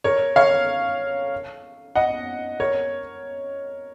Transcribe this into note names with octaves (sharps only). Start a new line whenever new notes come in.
A#4 C#5
C#5 F5
D#5 F#5
A#4 C#5